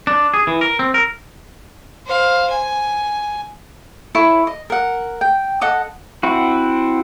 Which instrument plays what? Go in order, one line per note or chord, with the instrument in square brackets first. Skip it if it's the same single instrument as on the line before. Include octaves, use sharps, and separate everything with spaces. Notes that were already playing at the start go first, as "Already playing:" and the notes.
[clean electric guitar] D4
G#4
E3
A#4
C4
A#4
[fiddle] C5 F5
G#5
[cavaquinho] E4 A4 C#5
D#5
A#4 F#5
G5
A4 D#5 F#5 D#6
[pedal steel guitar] C4 E4 F#4